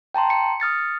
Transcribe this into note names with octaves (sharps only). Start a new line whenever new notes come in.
G5 A5 A#5 C6
C#7
D#6 F6 A6 C#7